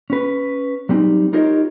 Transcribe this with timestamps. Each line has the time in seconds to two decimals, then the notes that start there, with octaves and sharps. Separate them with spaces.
0.10 C#4 B4
0.89 F#3 G3 C4 D#4
1.33 D#4 F4 G4 A#4 C#5 D#5